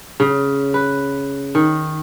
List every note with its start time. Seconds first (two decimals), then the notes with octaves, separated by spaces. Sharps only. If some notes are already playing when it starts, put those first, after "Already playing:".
0.20 C#3
0.74 B4
1.55 D#3